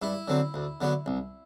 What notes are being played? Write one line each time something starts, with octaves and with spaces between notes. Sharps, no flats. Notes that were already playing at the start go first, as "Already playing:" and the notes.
G2 E4
D3 F#3 C4
D2
D3 F#3 B3
C2